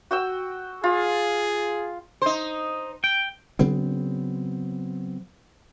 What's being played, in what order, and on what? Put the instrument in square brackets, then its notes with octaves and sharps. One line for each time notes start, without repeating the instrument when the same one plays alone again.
[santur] F#4 G5 E6
[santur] F4 [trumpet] G#4
[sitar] D#4 C5
[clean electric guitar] G5
[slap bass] C#3 F#3 B3 C4